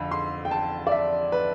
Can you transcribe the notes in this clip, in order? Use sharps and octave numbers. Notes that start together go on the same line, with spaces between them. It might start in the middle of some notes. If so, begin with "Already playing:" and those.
Already playing: F2 D3 F5 B5
C6
G5
A5
D5
E5
B4